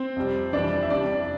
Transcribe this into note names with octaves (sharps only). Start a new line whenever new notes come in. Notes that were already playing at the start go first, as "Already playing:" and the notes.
Already playing: C4 C5
F2 C3 G3
F2 E3 G3 D4 D5
E5
F2 C3 G3 D4 D5